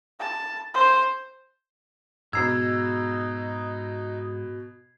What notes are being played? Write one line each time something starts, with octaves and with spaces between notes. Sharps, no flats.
A5
C5
G#2 B2 D#4 A#5 E6 G#6 C7